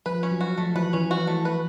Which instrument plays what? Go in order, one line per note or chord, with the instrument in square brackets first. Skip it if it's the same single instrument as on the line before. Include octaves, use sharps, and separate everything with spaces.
[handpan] F3 [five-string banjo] B4
[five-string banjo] C#4
[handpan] F#3
[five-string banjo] F#4
[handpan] F3 [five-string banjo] A3
[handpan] E3 [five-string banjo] B4
[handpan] E3 [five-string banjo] C#4
[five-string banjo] F#4
A3
B4